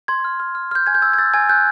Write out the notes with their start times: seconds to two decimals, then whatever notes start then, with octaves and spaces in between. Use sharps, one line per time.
0.08 C6 G#6
0.24 F6
0.40 F6
0.55 F6
0.71 F6 G6
0.87 G#5 G#6
0.95 G6
1.02 E6 G#6
1.14 G#6
1.18 E6 A6
1.34 G#5 G#6
1.49 F#6 G6